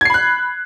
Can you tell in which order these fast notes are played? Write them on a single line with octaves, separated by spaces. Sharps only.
G#6 C7 B5 F#6